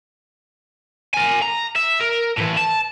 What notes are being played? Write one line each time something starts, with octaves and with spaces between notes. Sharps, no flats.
A#4 G#5
A#5
E5
A#4
A2 E3
A5